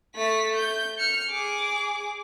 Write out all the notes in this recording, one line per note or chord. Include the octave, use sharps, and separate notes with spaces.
A3 B6
G6
F6 C#7
G#4 D6